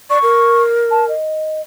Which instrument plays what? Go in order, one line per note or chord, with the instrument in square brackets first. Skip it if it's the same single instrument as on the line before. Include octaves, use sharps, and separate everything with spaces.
[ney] D5 [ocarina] C#6
[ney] A#4
[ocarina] A5
D#5